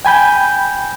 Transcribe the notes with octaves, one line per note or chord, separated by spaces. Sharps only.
G5 G#5 B5 G6